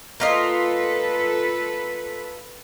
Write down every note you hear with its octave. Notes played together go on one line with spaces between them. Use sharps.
A#3 F4 A4 B4 D#5